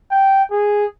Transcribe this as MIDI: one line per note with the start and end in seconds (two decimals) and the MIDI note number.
0.11 0.43 79
0.51 0.85 68